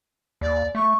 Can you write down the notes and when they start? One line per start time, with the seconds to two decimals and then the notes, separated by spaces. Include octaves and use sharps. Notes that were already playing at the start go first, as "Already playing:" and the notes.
0.41 D#2 D5
0.75 A3 C#6